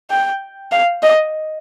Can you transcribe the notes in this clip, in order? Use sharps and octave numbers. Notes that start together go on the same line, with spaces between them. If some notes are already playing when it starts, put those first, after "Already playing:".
G5
F5
D#5